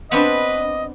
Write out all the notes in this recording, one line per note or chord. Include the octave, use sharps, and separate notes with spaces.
B3 C4 D4 B4 D#5